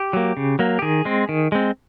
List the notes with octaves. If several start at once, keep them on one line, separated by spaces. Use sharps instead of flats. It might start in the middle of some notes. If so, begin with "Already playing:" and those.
Already playing: G4
F#3 A#3
C#3
F#3 A#3
G4
D#3 G#4
G#3 C4
D#3
G#3 C4